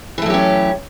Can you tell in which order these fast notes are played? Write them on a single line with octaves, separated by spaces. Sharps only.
E3 A3 F#3 G4 C#4